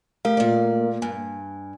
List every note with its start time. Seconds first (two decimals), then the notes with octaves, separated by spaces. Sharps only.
0.25 A3 G4 A#4 F5
0.37 A#2 A#3 D5
1.02 G2 G#5